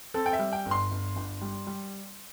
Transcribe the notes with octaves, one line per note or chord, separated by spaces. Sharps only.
C4 A4
G5
E5
G3
G5
G1
C6
G1
G1
G3
G3